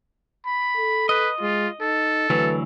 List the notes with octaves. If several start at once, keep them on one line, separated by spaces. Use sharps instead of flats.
B5
A4
B4 D#5
G#3 F4
D#4 A4
D2 E3 F#3 B4